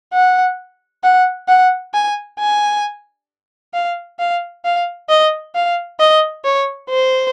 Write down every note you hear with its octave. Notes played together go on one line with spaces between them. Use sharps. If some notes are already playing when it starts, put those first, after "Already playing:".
F#5
F#5
F#5
G#5
G#5
F5
F5
F5
D#5
F5
D#5
C#5
C5